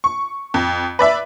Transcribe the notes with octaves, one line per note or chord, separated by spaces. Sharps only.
C#6
F2
B4 D5 E5